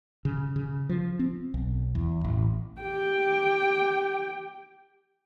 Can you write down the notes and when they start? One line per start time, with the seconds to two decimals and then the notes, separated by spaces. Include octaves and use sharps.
0.25 C#3
0.56 C#3
0.89 F3
1.19 C4
1.54 B1
1.95 E2
2.24 A1
2.81 G4 G5